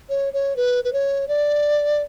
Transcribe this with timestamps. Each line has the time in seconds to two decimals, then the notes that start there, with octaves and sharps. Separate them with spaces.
0.09 C#5
0.33 C#5
0.56 B4
0.84 B4
0.93 C#5
1.28 D5